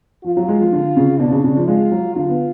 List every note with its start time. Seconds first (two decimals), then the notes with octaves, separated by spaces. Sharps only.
0.24 F3 F4
0.37 F#3
0.48 G#3
0.60 F3
0.73 D3
0.97 C#3
1.20 B2 D4
1.32 C#3
1.44 C#3
1.56 F3
1.68 G#3 F4
1.92 F#3
2.15 D3 F4
2.29 B3